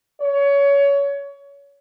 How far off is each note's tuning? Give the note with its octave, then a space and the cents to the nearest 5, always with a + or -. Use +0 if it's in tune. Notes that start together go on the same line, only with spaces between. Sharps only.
C#5 +25